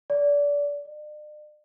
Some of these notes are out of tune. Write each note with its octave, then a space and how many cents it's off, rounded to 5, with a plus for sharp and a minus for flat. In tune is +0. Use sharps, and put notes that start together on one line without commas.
D5 -25
D5 +45